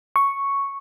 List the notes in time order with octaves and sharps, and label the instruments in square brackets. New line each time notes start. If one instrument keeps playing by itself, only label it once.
[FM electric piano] C#6